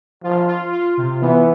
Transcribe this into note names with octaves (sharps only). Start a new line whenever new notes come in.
F3 F4
F4
F4
C3
E3 B3